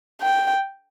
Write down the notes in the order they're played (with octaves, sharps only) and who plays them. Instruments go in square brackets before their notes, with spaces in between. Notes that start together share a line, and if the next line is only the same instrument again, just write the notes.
[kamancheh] G5